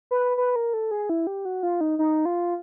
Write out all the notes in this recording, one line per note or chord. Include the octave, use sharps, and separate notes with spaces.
B4
B4
A#4
A4
G#4
E4
G4
F#4
F4
D#4
D#4
F4